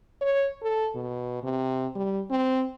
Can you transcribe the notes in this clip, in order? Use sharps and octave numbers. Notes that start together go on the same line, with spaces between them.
C#5
A4
B2
C3
G3
C4